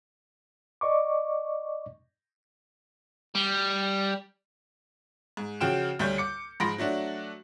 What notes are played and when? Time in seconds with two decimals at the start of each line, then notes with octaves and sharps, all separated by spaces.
0.81 D5 D#5 C#6 D6
3.35 G3
5.37 G#2
5.61 C#3 F3 F#4 G5 F6 E7
5.99 D2 G3 C#5 G6
6.18 D6 C#7
6.60 G#2 F3 B5 C6 A#6 D7
6.78 F#3 A3 D4 F#4